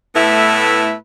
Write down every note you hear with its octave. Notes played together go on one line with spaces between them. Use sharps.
A2 A3 B3 E4 B4 E5